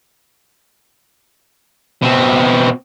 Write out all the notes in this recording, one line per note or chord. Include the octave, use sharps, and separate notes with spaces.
B2 C4